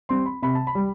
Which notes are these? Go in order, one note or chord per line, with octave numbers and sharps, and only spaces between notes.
G3 C4 C6
B5
C3 B5
A5
B5
G3